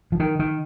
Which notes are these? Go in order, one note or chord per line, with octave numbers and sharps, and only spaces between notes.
F3
D#3
D#3